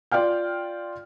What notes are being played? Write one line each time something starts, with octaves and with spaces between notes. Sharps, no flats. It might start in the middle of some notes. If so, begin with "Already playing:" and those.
F4 D5 F5 G5 F6